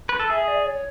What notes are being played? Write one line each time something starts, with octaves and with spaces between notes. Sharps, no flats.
B4
A4
G#4 E5
D5
C#5